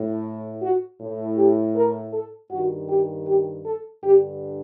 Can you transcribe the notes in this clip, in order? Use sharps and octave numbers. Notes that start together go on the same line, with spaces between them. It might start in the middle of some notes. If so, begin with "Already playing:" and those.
Already playing: A2
F#4
A2
G4
A#4
A4
G2 D#3 F#4
G4
G4
A4
G2 D3 G4